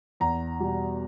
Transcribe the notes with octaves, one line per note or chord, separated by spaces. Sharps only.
E2 A#5
B2 G3